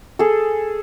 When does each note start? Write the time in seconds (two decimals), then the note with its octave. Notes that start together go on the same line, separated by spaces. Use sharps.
0.19 G#4 A4